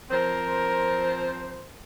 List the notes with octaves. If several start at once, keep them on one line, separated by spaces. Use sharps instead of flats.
F3 C4 A#4 C5